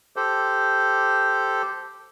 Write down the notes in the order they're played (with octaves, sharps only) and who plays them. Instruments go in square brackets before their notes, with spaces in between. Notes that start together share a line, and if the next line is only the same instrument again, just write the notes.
[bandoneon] G4 A4 C5